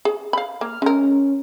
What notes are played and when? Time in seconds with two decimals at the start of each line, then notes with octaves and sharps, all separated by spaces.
0.05 G#4
0.33 F5 B5
0.61 A#3 F6
0.82 G#3 C#4 A#4